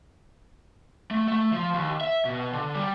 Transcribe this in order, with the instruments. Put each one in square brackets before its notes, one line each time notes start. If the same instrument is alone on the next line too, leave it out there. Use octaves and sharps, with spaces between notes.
[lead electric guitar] A3
A3
F3
D#2
E5
B2
D3
G3